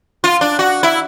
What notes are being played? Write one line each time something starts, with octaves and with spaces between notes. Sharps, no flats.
F4
D4
F#4
E4